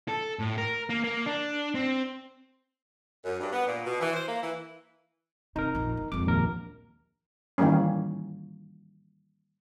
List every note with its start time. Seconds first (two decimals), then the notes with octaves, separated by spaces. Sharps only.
0.08 A4
0.39 A2
0.58 A#4
0.89 A#3
1.04 A#3
1.26 D4
1.75 C4
3.25 F#2
3.40 G2
3.53 B3
3.67 A#2
3.86 B2
4.01 E3
4.13 C5
4.28 A#3
4.43 E3
5.56 C3 D#4 A#4
5.75 A#1 F2
5.97 B3
6.12 F2 G#3 D6
6.26 A#1 D#2 A#4
7.58 D#3 E3 G3 A#3 C#4